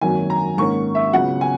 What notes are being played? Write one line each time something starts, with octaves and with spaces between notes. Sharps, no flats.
G#1 F#2 D#3 F#3 A#3 G#5
A#5
G#2 D#3 A#3 C#4 C#6
E5
C#2 C#3 F#3 B3 F#5
G#5